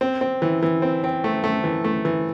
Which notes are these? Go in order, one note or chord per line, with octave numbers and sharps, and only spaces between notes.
C4
C4
E3
E3
C4
C4
A3
A3
E3
A3
E3